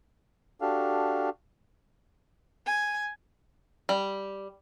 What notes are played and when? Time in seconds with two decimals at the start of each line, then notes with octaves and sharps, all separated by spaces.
0.61 D4 F#4 G4 A4 F5
2.66 G#5
3.89 G3